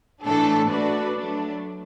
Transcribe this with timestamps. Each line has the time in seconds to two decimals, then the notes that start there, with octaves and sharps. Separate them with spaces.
0.24 A2 E3 A3 D4 A4
0.70 A3 D4 F#4 B4 D5
1.16 F#3 A3 D4